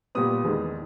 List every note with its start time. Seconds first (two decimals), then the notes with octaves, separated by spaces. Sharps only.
0.15 A#2 G3 B3 D#6
0.44 E2 D#3 G#3